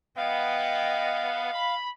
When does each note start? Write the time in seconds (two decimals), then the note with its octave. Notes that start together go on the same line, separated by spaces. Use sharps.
0.17 B3 D#5 F5 G5
1.53 B5